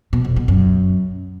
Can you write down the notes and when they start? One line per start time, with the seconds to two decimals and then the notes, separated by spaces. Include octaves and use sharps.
0.13 B2
0.25 F2
0.36 B2
0.48 F#2